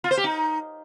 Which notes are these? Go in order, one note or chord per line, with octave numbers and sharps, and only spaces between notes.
F4
C5
G4
D#4